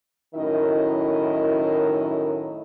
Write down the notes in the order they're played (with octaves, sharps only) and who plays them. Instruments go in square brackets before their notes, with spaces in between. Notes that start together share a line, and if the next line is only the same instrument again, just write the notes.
[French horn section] F#2 A2 D#3 E4 A#4 D#5